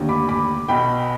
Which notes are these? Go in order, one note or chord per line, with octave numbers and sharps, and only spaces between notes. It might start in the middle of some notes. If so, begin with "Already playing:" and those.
Already playing: F1 D#2 D3
B5 D6
B5 D6
B1 B2 G5 B5